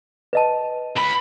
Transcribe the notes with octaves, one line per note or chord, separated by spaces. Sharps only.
B4 D#5 A5
C#2 B5